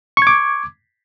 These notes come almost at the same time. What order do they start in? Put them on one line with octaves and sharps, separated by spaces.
C#6 G#6 D6